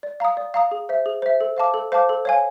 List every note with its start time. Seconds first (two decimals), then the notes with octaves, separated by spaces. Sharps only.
0.03 D5
0.20 F5 A#5 D#6
0.37 D5
0.54 F5 A#5 D#6
0.71 G#4
0.89 C5 E5
1.06 G#4
1.22 C5 E5
1.41 A4
1.57 C5 F5 A5 D6
1.74 A4
1.92 C5 F5 A5 D6
2.09 A4
2.25 C#5 F5 G#5